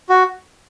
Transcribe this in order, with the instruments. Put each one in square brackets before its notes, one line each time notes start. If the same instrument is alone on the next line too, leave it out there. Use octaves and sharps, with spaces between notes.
[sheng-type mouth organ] F#4